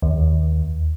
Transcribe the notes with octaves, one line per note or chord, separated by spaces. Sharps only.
D#2